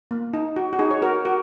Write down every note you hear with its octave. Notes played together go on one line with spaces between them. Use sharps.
A#3
D#4
F#4
F#4
D#4 G#4
C#5
F#4 A#4
F#4 A#4